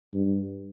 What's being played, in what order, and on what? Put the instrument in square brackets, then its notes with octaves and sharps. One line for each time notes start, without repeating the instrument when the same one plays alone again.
[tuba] G2